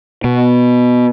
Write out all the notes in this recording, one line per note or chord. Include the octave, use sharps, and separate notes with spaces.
B2